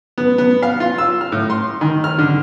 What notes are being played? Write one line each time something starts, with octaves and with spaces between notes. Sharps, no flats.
B3
B3
F5
F4
E6
F6
A2
C6
D#3
F6
D3